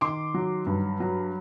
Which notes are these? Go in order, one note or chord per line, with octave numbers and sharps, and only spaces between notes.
D#3 C6 D6
F#3
G2
F#3